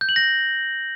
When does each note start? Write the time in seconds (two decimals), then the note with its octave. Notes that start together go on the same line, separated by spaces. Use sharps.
0.01 G6
0.09 F#7
0.16 A#6